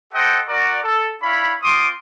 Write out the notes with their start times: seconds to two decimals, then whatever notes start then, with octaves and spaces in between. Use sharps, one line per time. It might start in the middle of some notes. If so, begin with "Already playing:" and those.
0.13 G4 A4 C5 D#5 F#5 G5
0.48 F#4 A#4 D5
0.83 A4
1.22 D4 E4 C#5 F5 B5
1.63 C4 F4 C6 D6 D#6